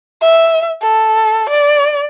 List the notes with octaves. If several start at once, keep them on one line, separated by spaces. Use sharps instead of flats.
E5
A4
D5